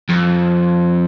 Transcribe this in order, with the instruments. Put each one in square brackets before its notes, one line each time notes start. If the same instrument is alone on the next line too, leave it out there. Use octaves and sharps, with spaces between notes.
[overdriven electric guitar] F2